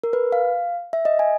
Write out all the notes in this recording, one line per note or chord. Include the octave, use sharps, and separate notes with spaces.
A#4
B4
F5
E5
D#5
G#5